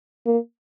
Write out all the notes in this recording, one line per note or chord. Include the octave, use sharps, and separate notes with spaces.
A#3